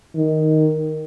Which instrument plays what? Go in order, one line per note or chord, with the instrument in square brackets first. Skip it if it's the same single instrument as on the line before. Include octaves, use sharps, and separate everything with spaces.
[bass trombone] D#3